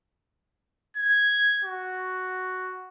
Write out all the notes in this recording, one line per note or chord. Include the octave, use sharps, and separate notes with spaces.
G#6
F#4